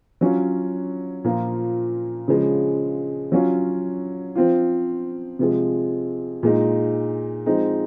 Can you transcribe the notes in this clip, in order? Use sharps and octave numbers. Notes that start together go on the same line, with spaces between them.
F#3 C#4 F4
A#2 F3 A#3 F4
C#3 F3 G#3
F#3 C#4 F4
F3 C4 F4
C3 F3 G#3
A#2 G#3 D#4
F3 G#3 C4 D#4